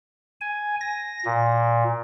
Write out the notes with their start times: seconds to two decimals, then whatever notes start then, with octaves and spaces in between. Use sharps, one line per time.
0.41 G#5
0.81 A#6
1.25 A#2